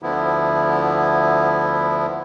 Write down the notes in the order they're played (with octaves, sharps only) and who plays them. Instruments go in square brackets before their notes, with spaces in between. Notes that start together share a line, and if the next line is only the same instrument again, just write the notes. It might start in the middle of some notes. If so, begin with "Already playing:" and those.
[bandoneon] D2 D3 F3 B3 E4